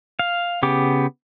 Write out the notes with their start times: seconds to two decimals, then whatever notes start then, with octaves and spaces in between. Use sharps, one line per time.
0.19 F5
0.63 C#3 B3 G4 D6